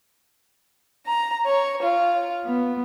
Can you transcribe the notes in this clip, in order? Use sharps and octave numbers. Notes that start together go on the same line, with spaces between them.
A#5
C#5
F4
B3